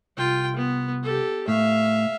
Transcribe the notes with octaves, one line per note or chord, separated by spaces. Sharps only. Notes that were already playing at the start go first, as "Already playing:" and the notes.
C2 F4 G5
B3
G4 A4
A2 E5 F5